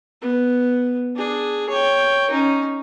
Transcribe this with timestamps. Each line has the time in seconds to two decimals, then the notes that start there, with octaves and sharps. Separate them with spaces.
0.22 B3
1.16 D4 G#4
1.70 C#5 G5
2.31 C#4 D#4